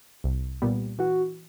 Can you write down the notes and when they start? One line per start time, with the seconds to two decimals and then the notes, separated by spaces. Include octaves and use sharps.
0.24 C2
0.62 A#2 G3 B3
0.99 E3 F#4